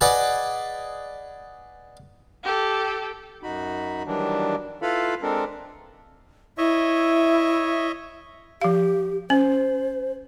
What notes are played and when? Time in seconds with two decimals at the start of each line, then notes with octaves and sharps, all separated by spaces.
0.01 G#4 B4 D5 D#5 F#5 G#5
2.44 G4 A4
3.43 F#2 D#4 F#4 B5
4.06 D#3 E3 F#3 G3 D4
4.82 E4 F4 A4 B4 F5 B5
5.22 G#3 C4 D4 A4 A#4
6.58 E4 C#5 D#5 E5
8.61 F3 G4 F5
9.30 C#4 C5